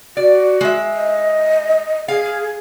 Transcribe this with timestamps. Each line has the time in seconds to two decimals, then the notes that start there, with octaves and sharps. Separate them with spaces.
0.17 F#4 D5
0.61 G#3 E5
0.94 D#5
2.08 G#4 F5